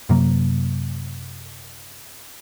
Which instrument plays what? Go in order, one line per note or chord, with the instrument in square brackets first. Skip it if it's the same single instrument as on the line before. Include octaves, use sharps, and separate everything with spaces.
[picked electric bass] F#2 C3 F#3 A#3